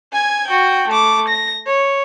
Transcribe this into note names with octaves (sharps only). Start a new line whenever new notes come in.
G#5 G#6
F#4 G5
A3 D6
A#6
C#5